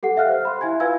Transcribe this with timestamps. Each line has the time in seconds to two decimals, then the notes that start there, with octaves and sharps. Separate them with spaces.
0.03 G4 A4 F#5 C7
0.17 E5 F5 G5 F6 F#6
0.29 C5
0.45 B5 C6
0.61 E4 E5 G#5 G#6
0.80 F4 B4 F5 G#5 E6 G#6